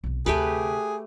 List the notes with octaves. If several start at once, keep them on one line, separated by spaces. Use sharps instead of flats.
B1 C3
D2 C3 A3 G4 G#4 B4